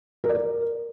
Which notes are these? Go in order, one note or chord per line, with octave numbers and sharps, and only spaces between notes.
A#4
D5
A#4